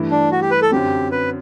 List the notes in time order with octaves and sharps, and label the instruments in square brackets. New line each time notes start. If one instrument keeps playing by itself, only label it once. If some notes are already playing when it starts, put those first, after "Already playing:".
Already playing: [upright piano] G2 E3 A3 E4
[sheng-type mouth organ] D4
F#4
G4
B4
A4
[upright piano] F#2 D3 F#3 C4 [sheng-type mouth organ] G4
[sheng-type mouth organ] B4